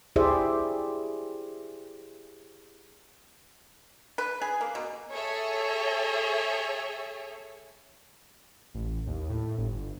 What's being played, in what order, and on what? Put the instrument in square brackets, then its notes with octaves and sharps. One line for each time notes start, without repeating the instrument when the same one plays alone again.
[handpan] E4 G4 G#4 C5 D5 E5
[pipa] B4
G#4
A#3
B2
[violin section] G#4 A4 C#5 E5
[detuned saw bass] A1
D#2
A2
G1